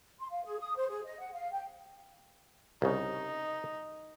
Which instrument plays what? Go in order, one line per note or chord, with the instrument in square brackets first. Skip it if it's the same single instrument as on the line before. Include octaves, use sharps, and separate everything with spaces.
[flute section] C6
F5
G#4
D#6
C5
G#4
D#5
F#5
F5
G5
[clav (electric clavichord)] C2 C#3 [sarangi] D#4